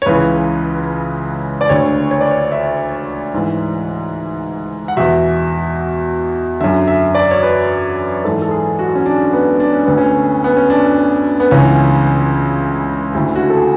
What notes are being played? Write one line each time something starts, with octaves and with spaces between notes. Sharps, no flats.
C#5
C#2 C#3 E3 B4
D5
D2 D3 C#5
C#5
D5
C#5
E5
G#2 E3
F#5
E2 B2 E5
F#2 D3 E5
E5
D5
C#5
B4
G#2 E3 A4
A4
G#4
F#4
C#4
D4
B3
D4
C#4
D2 D3 B3
C#4
B3
C#4
D4
B3
C#2 C#3 E3 C#4
D2 D3 E4
F#4
A4
G#4